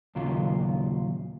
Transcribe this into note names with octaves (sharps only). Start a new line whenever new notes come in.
D#2 A#2 C#3 F#3 F4